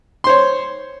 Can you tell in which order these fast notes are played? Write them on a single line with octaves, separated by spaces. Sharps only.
C6 C5 C#5